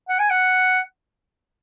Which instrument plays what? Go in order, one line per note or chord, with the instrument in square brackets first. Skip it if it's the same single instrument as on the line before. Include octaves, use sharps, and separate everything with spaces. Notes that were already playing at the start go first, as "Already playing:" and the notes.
[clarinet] F#5
G#5
F#5